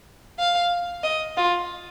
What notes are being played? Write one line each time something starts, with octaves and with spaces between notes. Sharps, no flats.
F5
D#5
F4